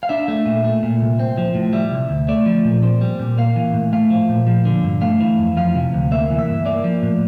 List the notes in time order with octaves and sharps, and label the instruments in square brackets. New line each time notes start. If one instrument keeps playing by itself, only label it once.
[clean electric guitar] F5
D4 E5
A3
A#2
A3
A#2
C2
C4
F3
A2
G3 E5
C3
D2
A3 D5
F3
A#2
C4
G3
A#2
A#3 F5
E3
A2
A3 F5
F3
A#2
F3
D3
G2
A3 F5
E3
F2
F3 F5
C3
D2
A#3 E5
E3
E5
G2
A#3 D5
F3
A2